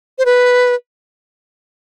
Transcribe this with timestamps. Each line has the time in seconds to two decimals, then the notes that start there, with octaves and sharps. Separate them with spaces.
0.19 C5
0.26 B4